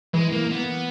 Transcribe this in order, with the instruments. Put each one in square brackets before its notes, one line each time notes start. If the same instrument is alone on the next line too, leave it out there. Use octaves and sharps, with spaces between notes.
[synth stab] E3 [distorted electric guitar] G#3
[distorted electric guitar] A#3
B3